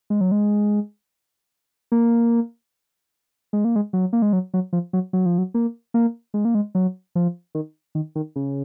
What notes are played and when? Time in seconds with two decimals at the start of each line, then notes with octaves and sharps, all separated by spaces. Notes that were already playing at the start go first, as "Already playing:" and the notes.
0.10 G#3
0.21 F#3
0.32 G#3
1.92 A#3
3.53 G#3
3.65 A#3
3.76 G#3
3.93 F#3
4.13 A#3
4.22 G#3
4.33 F#3
4.54 F#3
4.73 F3
4.93 F#3
5.13 F#3
5.26 F3
5.38 F#3
5.54 A#3
5.94 A#3
6.34 G#3
6.45 A#3
6.55 G#3
6.75 F#3
7.15 F3
7.55 D#3
7.95 D#3
8.15 D#3
8.36 C#3